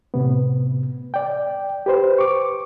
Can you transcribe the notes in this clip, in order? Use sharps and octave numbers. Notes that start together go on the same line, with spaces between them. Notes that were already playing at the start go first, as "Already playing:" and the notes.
A2 C3 B3
D5 G5
G4 B4 C5
C#6 D6